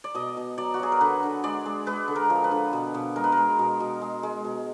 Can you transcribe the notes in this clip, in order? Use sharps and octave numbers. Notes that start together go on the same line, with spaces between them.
D5
B2 D#5
B2
F#3 D5
F#4
F#3 G#4
A#4
D3 B4
D3
G#3 D5
G#3
G#3 B4
D3
A#4
F3
B4
D3
B2
B2
G#3 A#4
B4
A#4
G#3
B2
B2
G#3
G#3
B2